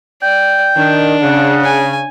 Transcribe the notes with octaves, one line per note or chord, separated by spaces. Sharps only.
D5 G5
D#3 D4
C#3 F#5
G#5